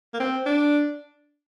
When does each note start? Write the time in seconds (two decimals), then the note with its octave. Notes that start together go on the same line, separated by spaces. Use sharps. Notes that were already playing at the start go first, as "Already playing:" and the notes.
0.13 A#3
0.20 C4
0.46 D4